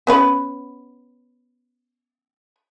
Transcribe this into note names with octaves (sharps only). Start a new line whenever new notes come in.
B3 C#4 B4